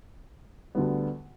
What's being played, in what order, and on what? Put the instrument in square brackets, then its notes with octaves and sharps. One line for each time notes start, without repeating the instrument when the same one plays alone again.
[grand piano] D2 D3 G3 B3